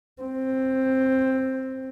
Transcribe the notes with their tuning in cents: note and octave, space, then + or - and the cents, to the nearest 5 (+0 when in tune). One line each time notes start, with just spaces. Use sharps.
C4 +10